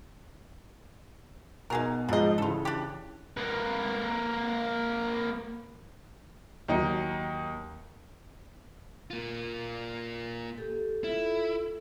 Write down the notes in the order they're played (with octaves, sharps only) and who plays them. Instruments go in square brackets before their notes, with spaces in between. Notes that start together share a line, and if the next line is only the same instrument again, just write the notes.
[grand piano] B2 [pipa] D#4 G#4 A#4
[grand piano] G#2 F3 G#3 [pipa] D4 D#5
[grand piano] C#3 E3 [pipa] F4 A4
[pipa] D4 G4
[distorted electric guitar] A#3 B4
[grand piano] D#2 F#3 D#4
[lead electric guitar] A#3 F4
[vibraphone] G4 A4
[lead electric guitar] E4 [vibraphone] F4 A4